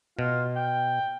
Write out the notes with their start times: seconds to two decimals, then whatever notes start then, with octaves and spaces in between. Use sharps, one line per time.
0.19 B2 F4
0.56 G5